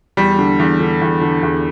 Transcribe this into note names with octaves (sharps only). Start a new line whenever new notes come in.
E2 G3
D3
E2
D3
E2
D3
E2